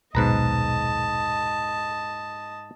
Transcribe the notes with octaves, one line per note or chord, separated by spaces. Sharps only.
D#1 B1 G#2 B2 B4 D#5 A5 A#5